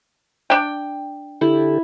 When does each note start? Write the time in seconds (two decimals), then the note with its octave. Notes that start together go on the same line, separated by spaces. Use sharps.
0.50 D4 G5
1.41 D3 E4 G4 A4